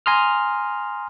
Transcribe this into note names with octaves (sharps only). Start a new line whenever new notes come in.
G#5 A#5 C6 D#6 F6